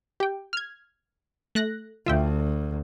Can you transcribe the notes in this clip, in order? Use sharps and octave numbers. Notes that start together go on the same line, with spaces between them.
G4 G5
F6 G#6
A3 F#6 A#6
D2 F4 E5 G5